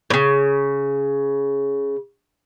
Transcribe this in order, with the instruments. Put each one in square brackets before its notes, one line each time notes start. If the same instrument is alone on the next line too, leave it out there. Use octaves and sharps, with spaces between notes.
[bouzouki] A2 C#3